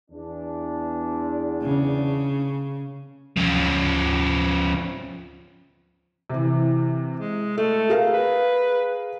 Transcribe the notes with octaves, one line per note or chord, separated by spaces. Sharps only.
E2 D4
C#3
F3 C#4
C3 E3
G#3
A3 A4
G#4 A#4 F5
B4